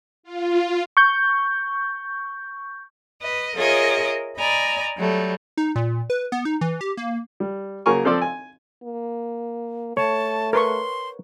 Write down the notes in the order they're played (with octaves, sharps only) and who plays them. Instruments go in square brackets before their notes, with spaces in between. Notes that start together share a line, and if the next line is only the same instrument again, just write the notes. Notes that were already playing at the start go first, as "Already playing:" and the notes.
[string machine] F4
[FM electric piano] C#6 G6
[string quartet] B4 D#5
F4 G#4 A#4 C#5 D#5 E5
D5 D#5 G#5 A#5 B5
F#3 G3 A3
[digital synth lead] D#4
A#2
B4
B3
D#4
E3
G4
A#3
[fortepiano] G3
C#3 F#3 A#3 A#4 G#5 C#6
F3 C4 A4 C5 D5
G#5
[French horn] A#3
[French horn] A3 [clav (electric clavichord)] C#5 [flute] A5
[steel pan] A#4 B4 C#6 [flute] C6